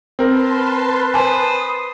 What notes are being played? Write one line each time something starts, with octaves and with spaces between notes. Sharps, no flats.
C4 A#4 B4 A5 C6
B4 C5 G#5 A5 D#6